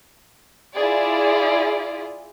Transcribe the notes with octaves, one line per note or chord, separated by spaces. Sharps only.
E4 F4 G#4 D5